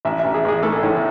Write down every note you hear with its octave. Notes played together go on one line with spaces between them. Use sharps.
A1 E5
E5
A1
G#4
A1 G#4
A3 A4
A2